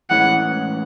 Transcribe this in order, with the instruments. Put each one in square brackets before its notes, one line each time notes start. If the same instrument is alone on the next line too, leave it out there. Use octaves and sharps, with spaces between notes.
[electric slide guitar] A2 E3 G#3 C#4 [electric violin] F#5